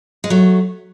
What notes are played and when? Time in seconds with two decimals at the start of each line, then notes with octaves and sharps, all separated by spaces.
0.24 G#3
0.30 F#3 A3